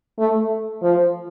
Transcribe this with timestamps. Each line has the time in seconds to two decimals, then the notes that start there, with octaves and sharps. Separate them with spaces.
0.19 A3
0.83 F3